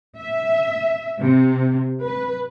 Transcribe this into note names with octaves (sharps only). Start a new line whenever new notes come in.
E5
C3
B4